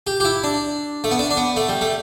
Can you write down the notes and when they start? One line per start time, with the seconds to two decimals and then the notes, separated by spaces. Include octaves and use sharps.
0.07 G4
0.20 G4
0.25 E4
0.44 D4
1.04 A3
1.11 B3
1.19 D4
1.31 D4
1.37 B3
1.56 A3
1.69 G3
1.81 A3